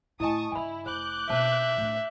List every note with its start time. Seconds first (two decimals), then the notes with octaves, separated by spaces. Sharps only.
0.20 D2 A2 E4 D#5 G#5 A5 C#6 D#6
0.52 G2 C#3 E4 G#5 B5
0.86 F1 C5 D6 F#6 G6
1.29 B2 A#3 C5 E5 A5
1.77 A2 D4